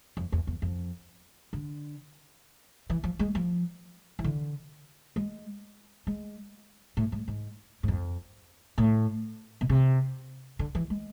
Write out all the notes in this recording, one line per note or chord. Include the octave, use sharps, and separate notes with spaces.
F2
E2
E2
F2
D3
E3
F3
G#3
F3
E3
D3
G#3
G#3
A2
G#2
G#2
G#2
F2
A2
B2
C3
D3
E3
G#3